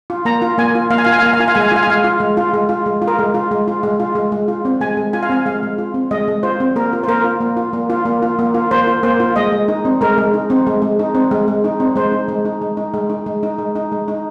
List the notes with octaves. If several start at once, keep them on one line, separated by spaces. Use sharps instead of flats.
F4
A#3 A#5
F4
A#3 G#5
F4
A#3 F5
G#5
F4 F5
G#5
F5
A#3 G#5
F5
F4 G#5
F5
G#3 G#5
F5
G#5
F4 F5
G#5
G#3 F5
F4
G#3
F4
G#3
F4
G#3
F4
A#4
G#3
F4
G#3
F4
G#3
F4
G#3
G#3
F4
C4
G#3 G#5
G#3
F4 G#5
F5
C4 G#5
G#3 F5
G#3
F4
C4
G#3 D#5
G#3
F4 C5
C4
A#3 A#4
F4
C5
A#3 A#4
F4
A#3
F4
A#3
F4
A#3
F4
A#3
F4
A#3 C5
F4
A#3 C5
F4
G#3 D#5
G#3
D#4
C4
G#3 A#4
G#3
D#4
C4
G#3
G#3
D#4
C4
G#3
G#3
D#4
C4
G#3 C5
D#4
G#3
D#4
G#3
D#4
G#3
D#4
G#3
D#4
G#3
D#4
G#3
D#4